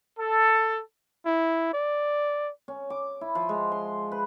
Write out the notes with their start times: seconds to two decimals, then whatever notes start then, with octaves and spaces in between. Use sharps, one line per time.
0.19 A4
1.26 E4
1.73 D5
2.68 C#4
2.90 D6
3.21 E4
3.35 F3
3.49 G#3
3.72 C6
4.12 B4